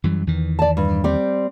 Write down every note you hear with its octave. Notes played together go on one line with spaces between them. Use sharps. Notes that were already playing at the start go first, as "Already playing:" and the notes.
F#2 E3 G3
E2 D#3 E3
D5 A5
G2
G3 C4 D5